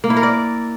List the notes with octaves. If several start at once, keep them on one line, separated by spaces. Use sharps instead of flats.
A#3
E4
A#4
D5